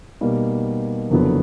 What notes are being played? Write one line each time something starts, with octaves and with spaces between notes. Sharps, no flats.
B2 G3 A#3 D#4
F#1 F2 D3 F#3 B3